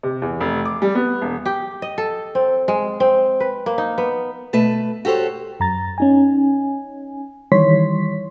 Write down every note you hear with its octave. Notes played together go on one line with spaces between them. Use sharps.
C3
E2
F1
D6
G3
B3
E1
G4
D#5
A4
C4
G#3
C4
B4
A#3
D#4
B3
B2 A3 B4 A5
F#4 G4 A4 C5 C#5
F#2 A#5 A6
C#4 D#4 G#5
D#3 E3 G3 C#5 C6 B6